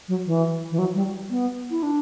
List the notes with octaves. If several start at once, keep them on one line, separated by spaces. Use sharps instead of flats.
F#3
E3
E3
F#3
G3
B3
E4
D4